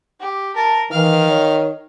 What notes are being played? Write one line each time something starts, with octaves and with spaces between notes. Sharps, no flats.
G4
A#4 A5
D#3 E3 F5 F6
C#5